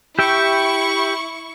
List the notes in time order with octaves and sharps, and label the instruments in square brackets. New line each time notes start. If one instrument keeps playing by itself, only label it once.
[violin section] E4 C#6 [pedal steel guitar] G4 E5 G5